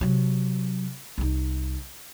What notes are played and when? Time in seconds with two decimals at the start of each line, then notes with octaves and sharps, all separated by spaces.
0.01 C3 F#3
1.18 C2 D#4